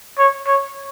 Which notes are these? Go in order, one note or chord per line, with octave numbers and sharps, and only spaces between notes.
C#5
C#5